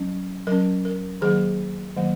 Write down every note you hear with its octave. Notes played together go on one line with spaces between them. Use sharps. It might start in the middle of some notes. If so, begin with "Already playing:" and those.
Already playing: F#3 C#4
F#3 C#4 A#4
A#4
D#3 F#3 A#3 G#4
D#3 F#3 A#3